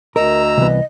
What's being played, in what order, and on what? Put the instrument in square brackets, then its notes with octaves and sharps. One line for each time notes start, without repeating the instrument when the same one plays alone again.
[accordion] D2 A#5 E6 [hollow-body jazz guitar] A#4 [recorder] D#5
[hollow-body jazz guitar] C2 E3 B3